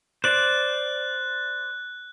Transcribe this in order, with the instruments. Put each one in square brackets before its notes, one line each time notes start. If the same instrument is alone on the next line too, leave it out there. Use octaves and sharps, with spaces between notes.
[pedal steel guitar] C5 D5 [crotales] F#6